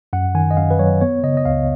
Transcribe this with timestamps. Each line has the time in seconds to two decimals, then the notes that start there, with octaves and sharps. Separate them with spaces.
0.13 F#2 F#5
0.35 D#3 G#5
0.51 D#5
0.57 F#2 F5
0.71 B4
0.79 F#3 C#5
1.01 B3 C#5
1.23 C#3 D#5
1.37 D#5
1.45 C#2 F5